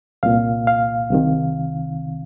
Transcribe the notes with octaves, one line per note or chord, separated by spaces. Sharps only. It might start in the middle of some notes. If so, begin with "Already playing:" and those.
C2 A#2 F5
F5
C2 C3 D#3